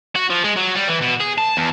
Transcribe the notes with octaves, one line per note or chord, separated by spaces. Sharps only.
F#4
F3
G#3
F#3
G3
E3
B2
G#4
A5
E2